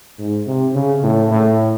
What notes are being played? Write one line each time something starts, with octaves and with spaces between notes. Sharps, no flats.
G#2
C3
C#3
A2
A2